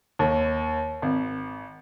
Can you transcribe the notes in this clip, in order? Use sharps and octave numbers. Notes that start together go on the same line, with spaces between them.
D#2
G#1